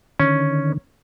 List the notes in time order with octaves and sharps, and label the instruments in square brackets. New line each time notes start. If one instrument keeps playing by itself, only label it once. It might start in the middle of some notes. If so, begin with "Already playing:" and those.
[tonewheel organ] D3 D#3 [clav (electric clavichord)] C#4